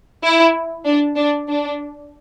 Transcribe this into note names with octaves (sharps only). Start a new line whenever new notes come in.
E4
D4
D4
D4